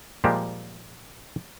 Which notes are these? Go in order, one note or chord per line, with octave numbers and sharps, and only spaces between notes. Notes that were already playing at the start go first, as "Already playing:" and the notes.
A#2 F3 G3 G#3 A#3 G4